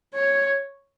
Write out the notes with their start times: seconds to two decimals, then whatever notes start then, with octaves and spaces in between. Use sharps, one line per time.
0.14 C#5